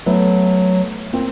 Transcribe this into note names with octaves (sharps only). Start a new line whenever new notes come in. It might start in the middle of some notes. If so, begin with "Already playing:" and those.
F#3 A3 B3
A#3 C4